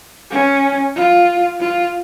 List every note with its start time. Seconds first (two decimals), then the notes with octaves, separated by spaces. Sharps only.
0.31 C#4
0.96 F4
1.60 F4